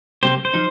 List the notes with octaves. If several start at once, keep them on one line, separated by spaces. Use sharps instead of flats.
C3 G3 A#3 G4 C5
C5
F3 D#4